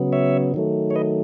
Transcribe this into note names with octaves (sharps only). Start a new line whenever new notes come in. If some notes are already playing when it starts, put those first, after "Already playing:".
Already playing: C#3 F#3 B3
C#5 E5
D#3 F#3 A3
C#5
B4 D#5